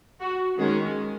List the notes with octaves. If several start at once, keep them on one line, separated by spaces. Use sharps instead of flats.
F#4
D#3 G#3 C#4 G#4